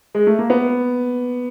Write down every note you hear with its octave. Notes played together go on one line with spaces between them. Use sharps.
G#3
A3
A#3
B3